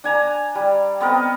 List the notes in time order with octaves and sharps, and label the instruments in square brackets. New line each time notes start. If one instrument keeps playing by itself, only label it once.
[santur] D4 G#5 A#5
G3
B3 C4 A#4 D#5